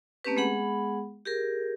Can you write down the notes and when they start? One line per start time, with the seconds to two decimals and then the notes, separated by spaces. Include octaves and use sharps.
0.25 A3 A#3 C4 C#4 G4 B4
0.37 G#3 B3 G#4 F#5 B5
1.25 G4 G#4 A#4